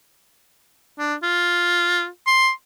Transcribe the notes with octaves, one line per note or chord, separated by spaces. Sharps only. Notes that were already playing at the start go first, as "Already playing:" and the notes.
D4
F4
C6